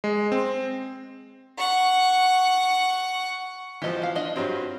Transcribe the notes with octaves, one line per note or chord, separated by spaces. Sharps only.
G#3
C4
F#5 C#6
E3 F3 G4 D#5
B3 F5
D4 D#5
G2 F#3 C4 F4 C#5